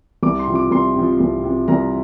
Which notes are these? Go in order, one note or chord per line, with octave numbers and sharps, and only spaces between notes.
C2 D6
C6
C3 F3
D6
C2 C6
C3 F3
C2
C3 F3
C2 A#5